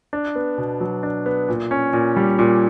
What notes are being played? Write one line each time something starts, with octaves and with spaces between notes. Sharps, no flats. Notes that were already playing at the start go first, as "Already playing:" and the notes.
D4
B3
B2
F#3
D4
B3
A#2
C#4
A#2
G3
A#2